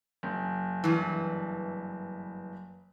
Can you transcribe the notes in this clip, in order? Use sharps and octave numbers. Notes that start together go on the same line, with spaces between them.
F#1
G2 E3